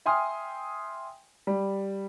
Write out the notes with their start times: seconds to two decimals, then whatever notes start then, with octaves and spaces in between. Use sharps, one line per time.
0.06 E5 G5 G#5 C6 D#6 F6
1.47 G3